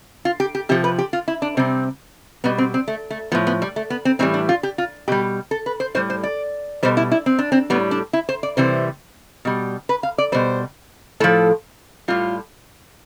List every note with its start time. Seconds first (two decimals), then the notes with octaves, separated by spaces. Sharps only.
0.25 F4
0.40 G4
0.55 G4
0.69 C3 F3 G4
0.84 B4
0.98 G4
1.13 F4
1.28 E4
1.42 D4
1.57 C3 G3 C4
2.44 B2 G3 B3
2.58 C4
2.74 C4
2.88 A3
3.11 A3
3.32 F3 B3
3.35 A2
3.47 B3
3.62 G3
3.76 A3
3.90 B3
4.05 C4
4.19 A2 E3 G3 C4
4.34 D4
4.49 F4
4.63 G4
4.78 F4
5.08 B2 G3 G4
5.51 A4
5.66 B4
5.80 C5
5.95 A2 G3 C5
6.10 C5
6.23 D5
6.83 B2 G3 C5
6.97 E4
7.12 E4
7.26 C4
7.39 D4
7.52 C4
7.70 A2 G3 B3
7.91 D4
8.13 E4
8.29 C5
8.43 D5
8.57 C3 E3 G3 C5
9.45 B2 G3
9.89 B4
10.03 F5
10.18 D5
10.32 B2 G3 C5
11.20 A2 F3 A4
12.08 A2 G3 F4